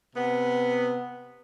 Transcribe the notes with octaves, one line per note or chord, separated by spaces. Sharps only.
C3 B3